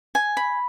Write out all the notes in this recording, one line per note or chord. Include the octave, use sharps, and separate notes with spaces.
G#5
B5